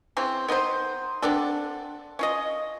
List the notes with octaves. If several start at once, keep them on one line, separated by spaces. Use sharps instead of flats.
C#3 E3 C4
B3 D#4 B4 C5
B3 C4 D4 A4
C#4 F4 D#5